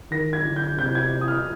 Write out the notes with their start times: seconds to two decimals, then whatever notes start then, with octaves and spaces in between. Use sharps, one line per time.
0.11 D#3 A#6
0.33 G#6
0.44 D3
0.56 G6
0.78 C3 G6
0.95 G#6
1.21 D#6
1.28 F6